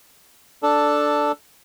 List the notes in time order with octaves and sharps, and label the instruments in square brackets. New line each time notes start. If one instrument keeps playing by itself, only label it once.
[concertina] D4 A4